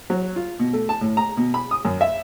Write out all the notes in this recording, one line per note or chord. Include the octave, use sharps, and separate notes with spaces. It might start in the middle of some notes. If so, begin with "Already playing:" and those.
F#3
F4
B2
A3
A5
A2
A#5
B2
B5
D#6
F#2
E5